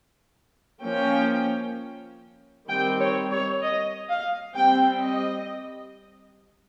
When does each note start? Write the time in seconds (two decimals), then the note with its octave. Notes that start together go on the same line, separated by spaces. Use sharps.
0.83 F3 A#3 C#4 G5
2.68 D#3 G3 C4 G5
3.00 C#5
3.31 C#5
3.62 D#5
4.09 F5
4.55 G3 C4 G5
5.02 D#5